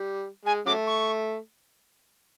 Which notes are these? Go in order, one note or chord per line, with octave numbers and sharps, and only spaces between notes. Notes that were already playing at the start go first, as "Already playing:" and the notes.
Already playing: G3
G#3 G#5
C#3 F#3 A3 D6
C#6